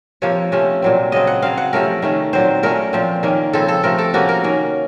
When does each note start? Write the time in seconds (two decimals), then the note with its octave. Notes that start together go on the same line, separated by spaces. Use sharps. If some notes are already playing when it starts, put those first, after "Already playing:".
0.22 C3 F3 A#3 C#5
0.52 C3 F3 A3 C#4
0.82 A#2 F#3 C4
1.12 C#3 F#3 C4 D#5
1.27 F#5
1.42 C#3 F#3 C4 F5
1.57 F#5
1.73 C3 F3 A3 C#4 A#4
2.02 D#3 A3 C#4
2.33 A#2 F#3 C4 C5
2.63 A#2 A3 C#4 A#4
2.93 A#2 F3 C4
3.23 D#3 A#3 C#4
3.53 C#3 F3 C4 A4
3.68 A4
3.84 C3 F3 A3 C4 A#4
3.98 A4
4.13 C3 F3 A#3 C#4 F#4
4.29 A#4
4.44 D#3 A#3 C#4